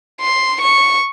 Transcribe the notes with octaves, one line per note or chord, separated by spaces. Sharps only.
C6
C#6